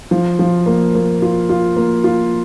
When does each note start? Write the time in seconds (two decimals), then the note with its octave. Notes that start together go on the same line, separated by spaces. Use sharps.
0.11 F3
0.39 F3
0.66 A#3
0.95 A#3
1.22 F4
1.49 F4
1.77 A#3
2.04 F4